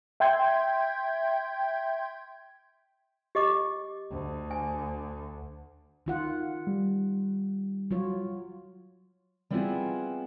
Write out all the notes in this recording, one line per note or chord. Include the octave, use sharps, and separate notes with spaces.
E5 G5 C6 G6 G#6
G4 D#5 D6
D2
G#5
D#3 F4 F#5
G3
F#3 F4 C#5
G3 B3 C4 E4 F4 G#4